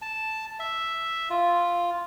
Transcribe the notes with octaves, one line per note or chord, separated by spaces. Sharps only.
A5
E5
F4